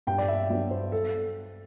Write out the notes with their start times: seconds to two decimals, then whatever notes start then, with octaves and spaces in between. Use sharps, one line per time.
0.07 G2 G5
0.18 D5
0.28 E5
0.50 F#3 B3 D4 D5
0.71 C5
0.92 A4